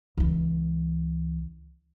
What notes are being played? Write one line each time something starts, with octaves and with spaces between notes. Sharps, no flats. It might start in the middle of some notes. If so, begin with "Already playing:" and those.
C#2 E3